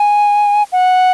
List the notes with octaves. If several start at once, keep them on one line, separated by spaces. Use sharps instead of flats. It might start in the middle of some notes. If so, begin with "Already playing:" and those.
Already playing: G#5
F#5